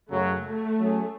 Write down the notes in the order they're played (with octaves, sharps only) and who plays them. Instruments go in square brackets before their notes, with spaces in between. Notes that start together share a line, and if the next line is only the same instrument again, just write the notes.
[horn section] F#2 C#3 F#3 [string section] A3
[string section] A3
[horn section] F#3 C#4 G#4